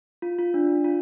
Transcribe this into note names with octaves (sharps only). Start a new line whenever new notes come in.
F4
F4
D4
F4